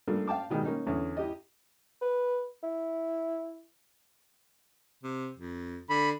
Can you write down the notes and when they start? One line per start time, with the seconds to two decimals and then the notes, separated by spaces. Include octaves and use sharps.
0.08 G2 F3 A3 A#3
0.28 F5 G5 A5 D6
0.50 B2 D#3 G3 G#3
0.65 A#3 C#4 D#4
0.87 E2 D3 C#4
1.17 E4 G4 D#5
2.01 B4
2.63 E4
5.03 C3
5.37 F2
5.90 D3 B5